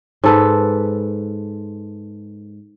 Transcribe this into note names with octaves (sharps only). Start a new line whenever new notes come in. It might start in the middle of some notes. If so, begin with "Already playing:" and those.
G#2 A4 B4